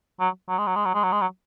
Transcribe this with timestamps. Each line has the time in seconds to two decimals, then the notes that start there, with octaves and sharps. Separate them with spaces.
0.20 F#3
0.48 F#3
0.58 G#3
0.67 F#3
0.76 G#3
0.85 F#3
0.94 G#3
1.03 F#3
1.12 G#3
1.21 F#3